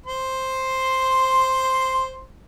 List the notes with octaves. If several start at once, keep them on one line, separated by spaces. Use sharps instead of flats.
C5 C6